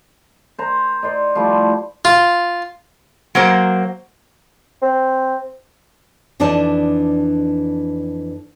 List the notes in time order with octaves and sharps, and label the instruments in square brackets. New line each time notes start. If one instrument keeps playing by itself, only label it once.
[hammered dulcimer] C5 A#5
C5 D5 D#5
F3 G3 A3 E4
[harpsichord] F4
[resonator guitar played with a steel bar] F#3 A#3 C5
[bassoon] C4
[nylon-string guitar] F2 E3 D4 D#4 D5 A5